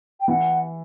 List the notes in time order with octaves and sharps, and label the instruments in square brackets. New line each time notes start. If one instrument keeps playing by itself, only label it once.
[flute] G5
[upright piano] E3 [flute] F#5